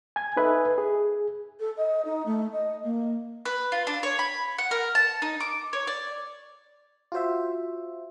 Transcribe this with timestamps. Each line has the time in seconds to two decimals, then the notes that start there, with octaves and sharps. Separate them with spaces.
0.16 G#5 G#6
0.37 D#4 A4 B4 D#5 E5 G#5
0.78 G#4
1.59 A4
1.76 D#5
2.05 D#4
2.25 A3
2.52 D#5
2.83 A#3
3.45 B4
3.72 F4
3.87 D4
4.03 C#5
4.19 B5
4.58 F#5
4.71 A#4
4.95 A5
5.22 D#4
5.40 D6
5.73 C#5
5.87 D5
7.12 F4 F#4 C5 E5